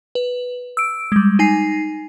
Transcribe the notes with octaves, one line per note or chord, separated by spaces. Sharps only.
B4
E6 D7
G3 G#3
D#4 G#5 C7